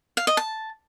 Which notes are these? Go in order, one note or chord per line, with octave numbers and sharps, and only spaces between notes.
F5
D#5
A5